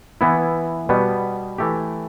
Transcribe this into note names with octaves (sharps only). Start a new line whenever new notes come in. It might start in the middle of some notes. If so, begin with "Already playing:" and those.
E3 B3 E4
B2 G3 B3
E3 A3 G4